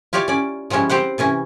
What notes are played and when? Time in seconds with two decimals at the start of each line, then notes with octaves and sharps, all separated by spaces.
0.13 E4 F4 G4 C#5 D5
0.28 C#4 D5
0.70 F3 G3 G#3 C#4 E4
0.89 C4 G4 C5 F#5
1.18 C3 E3 C#4 E4